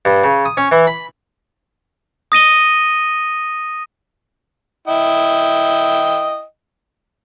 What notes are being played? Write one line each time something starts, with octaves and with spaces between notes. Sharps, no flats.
G2
C#3
D#6
C#4
E3
B5
D#6 A#6 D#7 G7
E4 D#5 G5